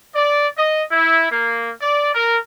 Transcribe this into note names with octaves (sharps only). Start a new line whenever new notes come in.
D5
D#5
E4
A#3
D5
A#4